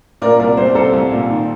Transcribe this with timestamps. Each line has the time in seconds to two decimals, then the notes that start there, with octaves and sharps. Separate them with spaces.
0.22 A#2 A#4 D5
0.39 C2 A#4 D5
0.57 C2 C5
0.66 D5
0.75 C2 A4 C5
0.93 C2
1.11 A#2
1.29 D#3